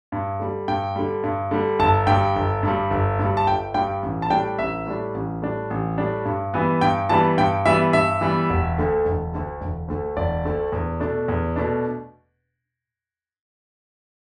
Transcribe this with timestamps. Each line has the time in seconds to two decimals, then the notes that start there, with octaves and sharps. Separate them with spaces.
0.12 G2
0.40 D3 G3
0.68 G2 G5
0.96 D3 G3
1.24 G2
1.51 D3 G3
1.79 G1 A5
2.07 G2 G3 G5
2.36 G1
2.63 G2 G3
2.91 G1
3.19 G2 G3
3.37 A5
3.47 G1 G5
3.74 G2 G3 G5
4.03 A1
4.22 A5
4.30 A2 G3 D4 G5
4.58 A1 E5
4.86 A2 G3 D4
5.14 A1
5.42 A2 G3 D4
5.70 A1
5.98 A2 G3 D4
6.25 G2
6.54 E3 G3 B3
6.81 G2 G5
7.09 E3 G3 B3 A5
7.37 G2 G5
7.66 E3 G3 B3 E5
7.93 G2 E5
8.21 E3 G3 B3
8.50 E1
8.78 D2 D3 A3
9.05 E1
9.33 D2 D3 A3
9.61 E1
9.88 D2 D3 A3
10.17 E1 D5
10.45 D2 D3 A3
10.72 E2
11.00 B2 A3 D4
11.28 E2
11.56 B2 A3 D4